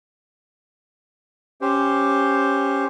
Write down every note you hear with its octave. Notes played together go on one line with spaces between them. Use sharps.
C#4 G4 C5